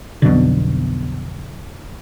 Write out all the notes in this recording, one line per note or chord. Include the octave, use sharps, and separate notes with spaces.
B1 F2 B2 D3